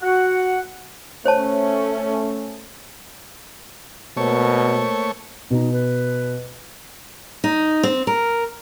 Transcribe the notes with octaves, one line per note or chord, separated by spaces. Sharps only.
F#4 F#5
A3 C#4 C5 C#5 A5
B2 A3 A#3 A#4 C5 C#5
B2 D#4
B4
D#4
C4
A#4